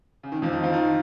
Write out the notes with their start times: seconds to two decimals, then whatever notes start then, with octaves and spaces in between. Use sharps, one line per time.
0.23 C#3
0.32 D#3
0.42 F2 F3
0.53 D#3 D#4
0.63 F3 F4
0.74 D#3 D#4